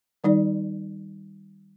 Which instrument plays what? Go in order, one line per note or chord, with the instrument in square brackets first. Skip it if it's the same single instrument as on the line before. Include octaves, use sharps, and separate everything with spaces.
[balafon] D#3 G3 D#4 D5